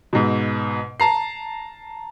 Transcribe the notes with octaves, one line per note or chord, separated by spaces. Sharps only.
G#2 B2
A5 A#5 C7